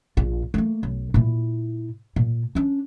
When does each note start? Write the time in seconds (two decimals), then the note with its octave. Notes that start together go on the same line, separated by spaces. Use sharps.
0.17 A#1 F4
0.54 A3 A#3
0.83 B1
1.14 A#2 E4
2.16 A#2
2.55 C#4 D4